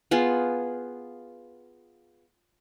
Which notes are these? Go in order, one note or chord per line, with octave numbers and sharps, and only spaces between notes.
B3 F4 G#4